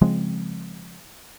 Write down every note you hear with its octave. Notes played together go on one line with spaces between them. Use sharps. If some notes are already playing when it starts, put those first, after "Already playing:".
C#3 F3 G#3 C4